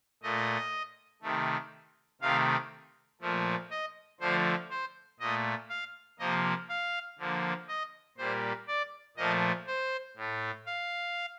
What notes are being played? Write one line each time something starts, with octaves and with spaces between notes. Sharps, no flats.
A#2 A3 D#5
C3 D#3 A3
C3 D#3 A3 F5
A#2 F3 A3
D#5
D3 F3 A3 C5
C5
A#2 A3 D#5
F5
C3 F3 A#3 D#5
F5
D3 F3 A#3
D#5
A#2 G3 A#3 C5
D5
A#2 F3 A3 D#5
C5
A2 A3
F5